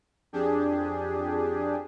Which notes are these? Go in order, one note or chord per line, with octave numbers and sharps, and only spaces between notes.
F2 D4 G4 G#4